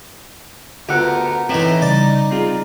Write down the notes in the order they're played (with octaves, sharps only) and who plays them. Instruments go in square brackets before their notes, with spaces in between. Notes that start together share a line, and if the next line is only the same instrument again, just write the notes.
[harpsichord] D2 [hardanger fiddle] B3 A#4 [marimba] F4 E6 F#6 [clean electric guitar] G4 F#5
[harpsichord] A2 E3 [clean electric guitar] C4 B4 E5 [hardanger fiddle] D#4
[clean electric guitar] C#3 [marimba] G3 [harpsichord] D5
[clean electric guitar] C4 F4 [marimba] G#4